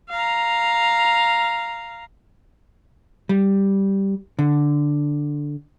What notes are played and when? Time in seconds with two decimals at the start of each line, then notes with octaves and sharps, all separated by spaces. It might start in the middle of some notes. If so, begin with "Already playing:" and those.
0.10 F5 A#5
3.29 G3
4.39 D3